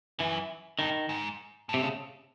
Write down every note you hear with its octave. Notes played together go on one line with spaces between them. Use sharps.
F#2 E3
G2 D#3
G#2
A2
C3
C#3